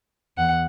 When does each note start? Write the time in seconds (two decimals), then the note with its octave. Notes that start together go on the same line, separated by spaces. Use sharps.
0.37 E2 F#5